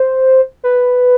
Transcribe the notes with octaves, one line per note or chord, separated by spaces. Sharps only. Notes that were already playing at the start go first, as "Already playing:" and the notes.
Already playing: C5
B4